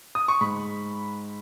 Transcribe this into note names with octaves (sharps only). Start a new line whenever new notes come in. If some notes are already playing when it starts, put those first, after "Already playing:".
D#6
C#6
G#2 B5